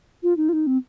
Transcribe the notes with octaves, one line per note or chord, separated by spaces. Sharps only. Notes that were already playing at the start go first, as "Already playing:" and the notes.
F4
D#4
F4
D#4
C4